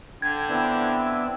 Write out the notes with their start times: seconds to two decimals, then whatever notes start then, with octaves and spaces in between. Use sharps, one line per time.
0.22 D3 G5 G#6
0.49 B3 C4 D4 E4 E6